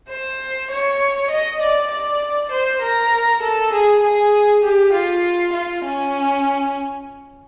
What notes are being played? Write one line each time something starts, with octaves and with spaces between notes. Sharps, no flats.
C5
C#5
D#5
D5
D5
C5
A#4
A4
G#4
G#4
G4
F4
F4
C#4